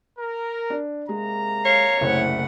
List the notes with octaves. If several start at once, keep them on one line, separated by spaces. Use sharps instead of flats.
A#4
D4
C3 G#3 A#3 A#5
C#5 F5
F#1 C2 A3 C5 F#5